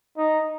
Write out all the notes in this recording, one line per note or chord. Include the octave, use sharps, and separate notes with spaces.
D#4